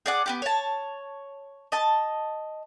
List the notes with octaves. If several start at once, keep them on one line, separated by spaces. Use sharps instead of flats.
G#4 D5 F#5
B3 F#4 G4
C#5 A5
D#5 A5